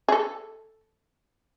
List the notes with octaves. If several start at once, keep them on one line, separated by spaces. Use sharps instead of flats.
G#4
A4